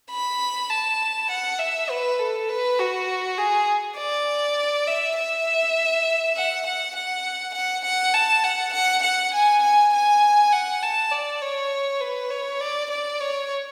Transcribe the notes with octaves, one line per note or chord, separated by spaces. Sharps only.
B5
A5
F#5
E5
B4
A4
B4
F#4
G#4
D5
E5
E5
F#5
F#5
F#5
F#5
F#5
A5
F#5
F#5
F#5
G#5
G#5
G#5
F#5
A5
D5
C#5
B4
C#5
D5
D5
C#5